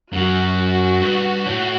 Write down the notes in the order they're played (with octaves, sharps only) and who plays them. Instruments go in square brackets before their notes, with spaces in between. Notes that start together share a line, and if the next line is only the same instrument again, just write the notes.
[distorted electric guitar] F#2 [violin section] F#4
[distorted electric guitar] G2
A2